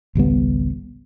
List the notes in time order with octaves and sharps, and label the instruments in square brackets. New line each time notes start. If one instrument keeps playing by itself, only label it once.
[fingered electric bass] G#1 C#2 G3 B3